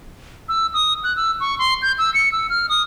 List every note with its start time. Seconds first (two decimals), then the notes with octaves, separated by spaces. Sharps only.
0.49 E6
0.74 D#6
1.04 F#6
1.16 E6
1.40 C#6
1.59 C6
1.82 G6
1.98 E6
2.14 C#7
2.32 E6
2.50 F6
2.69 D#6